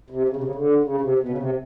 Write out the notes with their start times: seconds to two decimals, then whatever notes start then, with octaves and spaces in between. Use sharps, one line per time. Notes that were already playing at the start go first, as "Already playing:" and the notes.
0.10 C3
0.29 C#3
0.36 C3
0.44 C#3
0.55 D3
0.84 C#3
1.01 C3
1.19 B2
1.29 C#3
1.38 C3